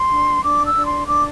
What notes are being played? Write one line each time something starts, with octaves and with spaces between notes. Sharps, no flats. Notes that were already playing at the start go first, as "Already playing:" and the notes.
Already playing: C6
D4
D4 D6
E6
D4
C6
D4 D6